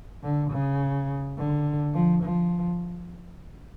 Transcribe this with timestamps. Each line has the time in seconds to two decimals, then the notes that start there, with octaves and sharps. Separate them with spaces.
0.23 D3
0.51 C#3
1.37 D3
1.94 F3
2.23 F3